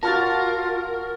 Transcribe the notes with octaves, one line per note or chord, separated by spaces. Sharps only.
F4 F#4 A#4 C#5 F#5 A5 F6 A6